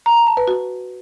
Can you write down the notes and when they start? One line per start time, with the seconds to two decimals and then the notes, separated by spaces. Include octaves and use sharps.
0.06 A#5
0.16 A#5
0.27 A5
0.37 B4
0.48 F#4